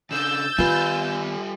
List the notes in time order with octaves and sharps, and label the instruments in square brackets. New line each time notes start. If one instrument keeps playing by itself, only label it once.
[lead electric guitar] C#3 D4 [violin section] E6 G6 A6
[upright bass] D#3 B3 [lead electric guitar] G3 G#5 [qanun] F4 B4